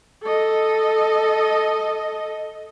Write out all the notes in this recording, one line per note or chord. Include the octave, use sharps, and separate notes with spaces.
A4 D#5